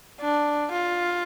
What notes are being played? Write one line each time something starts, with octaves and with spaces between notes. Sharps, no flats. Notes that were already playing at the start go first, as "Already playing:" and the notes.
D4
F4